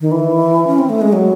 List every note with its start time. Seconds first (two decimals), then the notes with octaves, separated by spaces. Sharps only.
0.01 D#3
0.12 E3
0.67 C#4
0.79 C4
0.90 A3
1.02 G#3
1.13 F#3